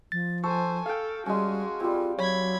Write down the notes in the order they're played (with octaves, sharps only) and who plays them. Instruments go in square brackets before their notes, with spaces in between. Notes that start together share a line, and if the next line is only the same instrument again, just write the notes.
[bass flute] F3 [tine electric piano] A6
[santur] A4 [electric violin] C5 G#5 [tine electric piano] C#6
[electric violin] A4 [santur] F5 G5
[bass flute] G3 [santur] G#3 C#4 [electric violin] F#4 G#4
[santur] G3 C4 [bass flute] F4
[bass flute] F#3 [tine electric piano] C#5 [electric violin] B5 G#6